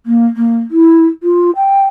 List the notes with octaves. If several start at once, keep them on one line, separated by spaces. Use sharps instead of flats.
A#3
A#3
E4
F4
G5